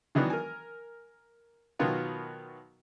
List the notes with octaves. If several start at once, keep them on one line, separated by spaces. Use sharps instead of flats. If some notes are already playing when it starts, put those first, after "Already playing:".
D#3 E3 F#3 B3 D4
A#4 G#5
B2 D#3 F#3 B3 F4 A#4